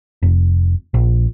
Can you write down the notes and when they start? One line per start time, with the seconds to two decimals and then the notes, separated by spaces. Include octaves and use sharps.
0.22 F1
0.94 A#1